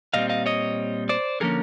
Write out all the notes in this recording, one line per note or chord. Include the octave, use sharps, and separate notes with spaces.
A#2 G3 C4 D#5 F5
D#5 F5
C#5 D#5
C5 D5
D3 F3 A#3 C#4 G#4 A#4